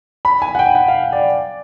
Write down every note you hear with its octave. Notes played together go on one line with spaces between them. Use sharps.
B5
G#5
F#5
G5
F#5
F5
D5